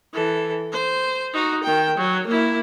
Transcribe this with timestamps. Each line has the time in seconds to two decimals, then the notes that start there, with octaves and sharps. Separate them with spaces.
0.13 E3 A4
0.72 C5
1.34 D#4 F#4
1.63 D#3 G5
1.98 F#3
2.27 A#3 E4